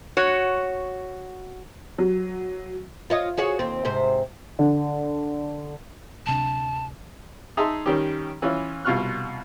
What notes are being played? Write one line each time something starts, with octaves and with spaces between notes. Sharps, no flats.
F#4 C#5
F#3
F4 C#5 D#5
F#4 G#4 C#5
D#2 C4
G#2 C3 C5
D3
D1 C3 D4 A5
D#4 G#4 E5 A5 C6
D#3 G3 C#4 G4
E3 C#4 E4 F4
C2 B2 F4 C#6 F6 F#6